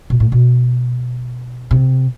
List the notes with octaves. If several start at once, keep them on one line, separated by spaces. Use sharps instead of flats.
B2
A2
B2
C3